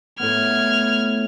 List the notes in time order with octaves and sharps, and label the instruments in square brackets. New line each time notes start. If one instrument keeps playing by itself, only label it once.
[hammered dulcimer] A2 B3 [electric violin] F6 G#6